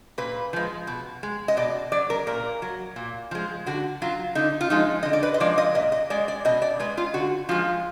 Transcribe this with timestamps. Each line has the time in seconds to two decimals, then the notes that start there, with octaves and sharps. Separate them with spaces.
0.18 A#2 B4
0.53 F3 G#3
0.87 B2
1.23 G#3
1.48 D#5
1.57 B2 D5
1.92 F#3 D5
2.10 A#4
2.27 A#2 A#4
2.62 F#3
2.96 A#2
3.31 F3 G#3
3.66 D3 F#4
4.02 F#3 F4
4.35 D3 D#4
4.61 F4
4.70 F3 G#3 D#4
5.03 D3 D#5
5.13 D5
5.23 B4
5.34 D#5
5.40 F3 G#3 D5
5.58 D#5
5.75 A#2 D#5
5.92 D#5
6.10 G#3 D5
6.28 D5
6.45 B2 D#5
6.62 D5
6.80 G#3 B4
6.97 F4
7.14 D3 F#4
7.49 F3 G#3 F4